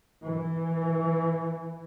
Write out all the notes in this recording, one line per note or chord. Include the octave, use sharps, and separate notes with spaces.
E3